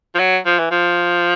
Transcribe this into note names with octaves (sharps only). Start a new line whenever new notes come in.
F3
F#3
F3
E3
F3